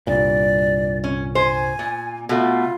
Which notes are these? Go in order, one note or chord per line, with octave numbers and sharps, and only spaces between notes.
C2 G2 A#2 D5
C#4
C5 G#5
A#2
B2 A3 F4